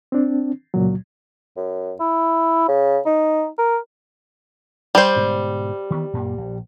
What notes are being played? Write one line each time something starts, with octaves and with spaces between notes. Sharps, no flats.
C4 D4
C#2 A#2 F#3
F#2
E4
C#3
D#4
A#4
G3 C5
G#2 B2 D3
D#3 E3 B3
F#2 A#2 A#3
A#1